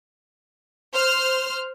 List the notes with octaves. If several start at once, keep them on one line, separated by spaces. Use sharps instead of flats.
C5 F6